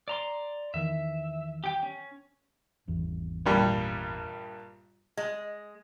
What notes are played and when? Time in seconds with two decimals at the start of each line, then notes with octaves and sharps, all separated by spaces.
0.08 D5 A#5 C6
0.74 E2 D#3 E3 E5
1.64 G4 G5
1.83 C#4
2.88 G#1 E2
3.46 A#1 G2 G3
5.17 G#3